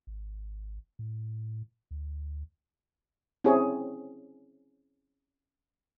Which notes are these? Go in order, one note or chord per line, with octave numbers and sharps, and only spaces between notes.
G#1
A2
D2
C4 C#4 E4 G4 G#4 C#5